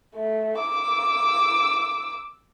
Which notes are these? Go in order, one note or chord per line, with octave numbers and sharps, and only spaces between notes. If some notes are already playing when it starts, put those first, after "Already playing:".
A3
D6 E6